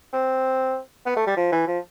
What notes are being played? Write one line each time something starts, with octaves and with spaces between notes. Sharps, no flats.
C4
B3
A3
G3
F3
E3
F3